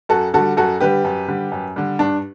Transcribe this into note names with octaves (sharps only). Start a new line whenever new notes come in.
F#2 F#4 A4
D3 G3 F#4 A4
F#2 F#4 A4
D3 G3 G4 B4
F#2
D3 G3
F#2
D3 G3
G2 D4